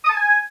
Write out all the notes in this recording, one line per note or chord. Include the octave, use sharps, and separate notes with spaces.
D#6
A5
G#5